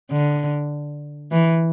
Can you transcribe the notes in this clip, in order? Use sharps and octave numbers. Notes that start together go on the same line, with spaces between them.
D3
E3